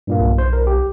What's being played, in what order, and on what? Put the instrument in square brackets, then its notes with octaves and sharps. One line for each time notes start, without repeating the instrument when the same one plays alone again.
[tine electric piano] G2 A#2 A#3
[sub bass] B1
[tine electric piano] C5
A#4
G4